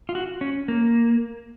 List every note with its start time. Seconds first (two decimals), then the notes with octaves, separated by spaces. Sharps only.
0.09 F4
0.15 F#4
0.41 C#4
0.68 A#3